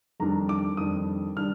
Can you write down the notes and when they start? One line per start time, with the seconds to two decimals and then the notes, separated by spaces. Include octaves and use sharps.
0.20 F2 D#3 G3 D4 A#5
0.49 D6
0.77 F2 D#3 G3 D4 D#6
1.37 D#3 G3 D4 F6